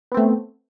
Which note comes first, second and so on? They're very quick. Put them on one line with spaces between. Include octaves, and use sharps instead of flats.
B3 C4 A3